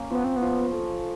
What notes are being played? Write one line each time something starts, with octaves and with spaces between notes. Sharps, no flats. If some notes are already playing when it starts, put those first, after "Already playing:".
Already playing: A#3 C#4
F3 B3
C4
B3
F3
A4